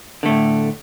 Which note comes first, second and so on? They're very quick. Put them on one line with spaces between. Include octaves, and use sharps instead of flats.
D3 A3 A2